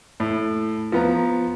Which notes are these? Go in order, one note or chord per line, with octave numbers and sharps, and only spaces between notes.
A2
F3 B3 A#5